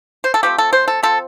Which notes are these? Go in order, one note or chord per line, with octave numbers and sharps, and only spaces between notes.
C5
A4
F3 A3 C4 G4
A4
C5
A4
F3 C4 A4